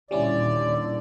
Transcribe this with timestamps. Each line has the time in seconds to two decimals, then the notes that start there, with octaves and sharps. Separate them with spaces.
0.11 D#2 A#2 D3 G3 C#4 E4 D5